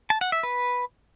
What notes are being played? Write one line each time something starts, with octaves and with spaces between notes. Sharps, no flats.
A5
F#5
E5
B4